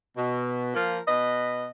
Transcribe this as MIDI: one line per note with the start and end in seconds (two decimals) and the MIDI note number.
0.17 0.70 47
0.74 0.97 53
0.74 0.97 58
0.74 0.97 65
0.74 0.97 70
1.07 1.67 47
1.07 1.67 71
1.07 1.67 75